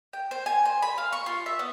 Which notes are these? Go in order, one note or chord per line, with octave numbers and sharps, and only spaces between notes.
G5
C5
G#5
C5
B5
F5
C#6
F4
E5
B3